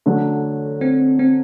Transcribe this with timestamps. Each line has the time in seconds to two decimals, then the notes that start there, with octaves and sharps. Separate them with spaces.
0.06 D3 F#3 A3 D4
0.81 C4
1.19 C4